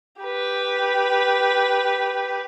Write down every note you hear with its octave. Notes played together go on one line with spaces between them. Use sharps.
G4 B4